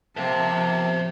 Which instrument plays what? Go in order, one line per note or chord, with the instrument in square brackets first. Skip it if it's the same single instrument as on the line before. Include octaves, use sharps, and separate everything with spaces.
[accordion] C3 A#3 C4 [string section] F3 [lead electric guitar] C5 E5 [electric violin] A5